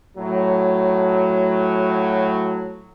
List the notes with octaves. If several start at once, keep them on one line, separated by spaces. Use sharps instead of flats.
A2 F#3